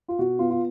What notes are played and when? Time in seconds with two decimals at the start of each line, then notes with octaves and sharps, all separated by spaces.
0.08 F4
0.19 B2 F#4
0.39 B3 F4
0.50 F4